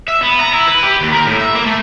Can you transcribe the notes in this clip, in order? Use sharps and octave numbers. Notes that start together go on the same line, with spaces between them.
E5
B3
A#5
E4
B4
G4
D#2
A#4
A2
E5
A#3
A3